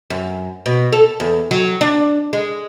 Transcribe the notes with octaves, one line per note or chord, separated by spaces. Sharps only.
F#2
B2
A4
E2
F#3
D4
G#3